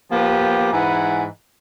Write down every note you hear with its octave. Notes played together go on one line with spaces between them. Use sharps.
F3 A#3 B3 G4
G#2 E3 B4 F#5 G#5 A#5